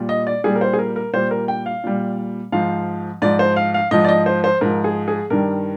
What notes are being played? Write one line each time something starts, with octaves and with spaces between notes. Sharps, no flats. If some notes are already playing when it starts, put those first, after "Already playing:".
Already playing: A#2 G3
D#5
D5
A#2 G3 G#4
A#4
C5
G#4
A#4
A#4
A#2 G3 C5
A#4
G5
F5
A#2 G3
G#2 F3 F5
G#2 F3 D5
C5
F5
F5
G#2 F3 D#5
D5
D#5
C5
C5
G#2 F3 A#4
G#4
G#4
G2 D#3 G3 A#4